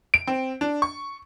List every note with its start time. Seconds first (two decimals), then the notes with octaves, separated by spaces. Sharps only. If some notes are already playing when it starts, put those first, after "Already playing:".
0.14 D7
0.27 C4
0.61 D4
0.82 C#6